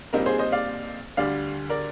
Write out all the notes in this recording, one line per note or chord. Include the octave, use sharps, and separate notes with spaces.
A#1 A#2 G3 C4 D#4 A#4
G#4 C5
C5 D#5
D5 F5
D2 D3 G3 D5 F5
A#4 D5